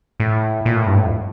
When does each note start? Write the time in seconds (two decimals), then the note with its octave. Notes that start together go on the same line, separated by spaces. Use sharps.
0.20 A2
0.65 A#2
0.76 A2
0.87 G2
0.98 A2
1.06 F2